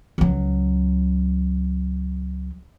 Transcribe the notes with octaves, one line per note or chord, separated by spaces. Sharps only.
C#2 F#3